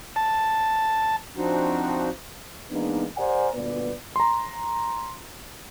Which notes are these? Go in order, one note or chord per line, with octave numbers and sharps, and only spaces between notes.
A5
F3 C4 D4 D#4 F#4
E3 G#3 A#3 B3 D4 D#4
G4 A#4 C5 D5 F#5 G#5
G1 D2 A#2 B3 B4 D5
A#5 C6